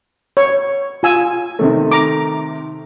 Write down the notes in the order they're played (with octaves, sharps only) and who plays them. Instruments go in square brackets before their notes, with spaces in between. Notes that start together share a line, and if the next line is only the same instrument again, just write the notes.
[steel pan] C#5
F4 G#5 E6
[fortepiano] C3 D#3 A3
[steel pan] A#5 D6